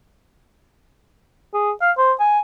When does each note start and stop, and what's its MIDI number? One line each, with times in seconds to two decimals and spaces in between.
1.54 1.71 68
1.81 1.91 77
1.98 2.12 72
2.20 2.40 80